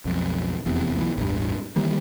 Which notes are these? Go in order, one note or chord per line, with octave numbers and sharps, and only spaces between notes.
B1 F2
F1 E2 C3
B1 B2 D3 E3
A1 E2 G2
D#3 E3 G3 A#3